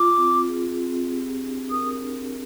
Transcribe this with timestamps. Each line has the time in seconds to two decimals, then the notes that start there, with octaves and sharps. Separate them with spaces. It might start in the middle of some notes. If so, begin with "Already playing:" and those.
Already playing: F4 D6
0.17 C4
0.48 G#4
0.79 C4
1.09 G4
1.41 D4
1.71 A#4 D#6
2.01 D4